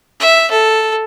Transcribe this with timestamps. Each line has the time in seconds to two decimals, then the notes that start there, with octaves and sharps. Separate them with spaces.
0.20 E5
0.51 A4